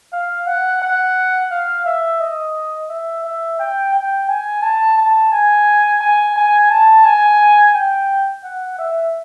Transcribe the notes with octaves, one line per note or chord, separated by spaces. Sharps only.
F5
F#5
F#5
F5
E5
D#5
E5
E5
G5
G5
G#5
A5
A5
G#5
G#5
G#5
A5
G#5
G5
F#5
E5